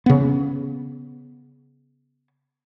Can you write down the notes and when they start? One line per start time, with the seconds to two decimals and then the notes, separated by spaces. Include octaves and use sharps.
0.06 C#3 B3